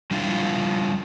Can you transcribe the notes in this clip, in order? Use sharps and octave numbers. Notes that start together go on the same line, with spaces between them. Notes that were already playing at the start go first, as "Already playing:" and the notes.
F3 G3 D4 E4 F4